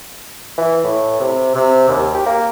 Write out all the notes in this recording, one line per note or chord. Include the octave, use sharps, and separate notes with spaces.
E3
A2
C3
C3
D#2
G4
A#3